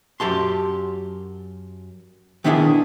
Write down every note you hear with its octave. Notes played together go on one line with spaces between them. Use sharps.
F#2 G4 A5 C6
D#3 B3 D4 E4 G#4